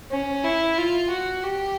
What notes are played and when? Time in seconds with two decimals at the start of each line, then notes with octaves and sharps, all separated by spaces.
0.11 C#4
0.44 E4
0.78 F4
1.11 F#4
1.44 G4